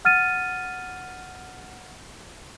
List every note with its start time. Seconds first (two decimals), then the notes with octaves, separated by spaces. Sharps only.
0.05 F#5 F6 A6 D#7